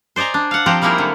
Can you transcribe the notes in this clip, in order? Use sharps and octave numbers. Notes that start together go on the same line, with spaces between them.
C5 D5 D#5 G#5 A#5
D4
F5 F#5
F3 C4 G4 C5 A#5
G3 A#3 D#4 E4 G#4 A#4
D3 F#3